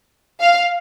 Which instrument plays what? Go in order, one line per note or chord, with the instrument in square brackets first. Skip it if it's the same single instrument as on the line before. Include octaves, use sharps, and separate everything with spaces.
[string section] F5